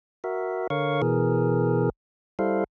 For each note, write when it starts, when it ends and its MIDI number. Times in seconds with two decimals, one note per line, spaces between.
0.24 0.67 66
0.24 0.67 70
0.24 0.67 76
0.70 1.02 50
0.70 1.02 70
0.70 1.02 73
0.70 1.02 77
0.70 1.02 85
1.02 1.90 47
1.02 1.90 52
1.02 1.90 68
1.02 1.90 70
2.39 2.64 55
2.39 2.64 64
2.39 2.64 69
2.39 2.64 72
2.39 2.64 77